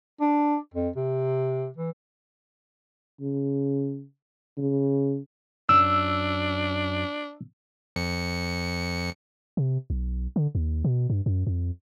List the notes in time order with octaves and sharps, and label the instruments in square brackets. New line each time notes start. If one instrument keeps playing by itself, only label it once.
[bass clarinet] D4
F2
C3
E3
[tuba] C#3
C#3
[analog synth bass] F#2 [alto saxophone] D4 [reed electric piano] E6
[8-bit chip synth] F2 C#7
[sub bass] C3
B1
D3
D#2
B2
G2
F#2
F2